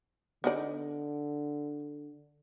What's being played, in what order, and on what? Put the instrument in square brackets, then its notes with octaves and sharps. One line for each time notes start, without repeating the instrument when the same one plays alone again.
[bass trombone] D3 [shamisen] B3 D#4 D5